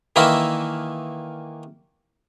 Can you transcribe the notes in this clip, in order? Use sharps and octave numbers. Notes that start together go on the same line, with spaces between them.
D#3 E3 A#3 E4